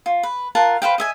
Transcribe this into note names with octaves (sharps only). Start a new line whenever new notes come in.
F4
B4
F4 A#4 F#5 A5
B4 C5 F5 G5
D#5 E5 G#5